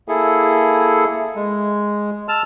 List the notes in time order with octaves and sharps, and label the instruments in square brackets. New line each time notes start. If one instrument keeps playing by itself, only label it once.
[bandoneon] A#3 E4 G#4 A4
G#3
A5 E6 F6